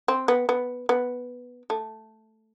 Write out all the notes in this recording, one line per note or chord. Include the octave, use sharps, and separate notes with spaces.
C4
B3
B3
B3
A3